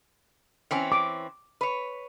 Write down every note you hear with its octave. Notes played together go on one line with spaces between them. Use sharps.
E3 C4 C#4
D6
B4 C#5